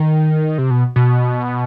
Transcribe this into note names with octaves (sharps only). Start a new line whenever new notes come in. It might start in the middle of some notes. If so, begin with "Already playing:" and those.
Already playing: D#3
C3
B2
B2